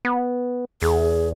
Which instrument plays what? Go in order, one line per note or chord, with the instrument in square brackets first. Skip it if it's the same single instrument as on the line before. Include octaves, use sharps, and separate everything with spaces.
[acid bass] B3
[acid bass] E2 [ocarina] G#4